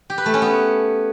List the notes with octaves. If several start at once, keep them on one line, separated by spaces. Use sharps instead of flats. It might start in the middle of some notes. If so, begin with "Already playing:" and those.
G4
B4
A3
C#4
B3